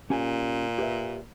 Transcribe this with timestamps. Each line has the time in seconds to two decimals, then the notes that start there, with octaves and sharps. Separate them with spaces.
0.10 A#2 C#4 G4 G#5
0.78 G4 B4 E5